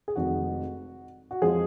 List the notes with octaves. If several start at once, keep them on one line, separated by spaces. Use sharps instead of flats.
G#4
F1 F2 D#3 G#3 F#4
F#4
F2 F3 G#3 G#4